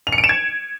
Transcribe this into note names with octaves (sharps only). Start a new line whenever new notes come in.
F7
C#7
D7
E7
G#6